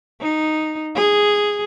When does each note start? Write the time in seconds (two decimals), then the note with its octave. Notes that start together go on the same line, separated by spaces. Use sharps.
0.21 D#4
0.96 G#4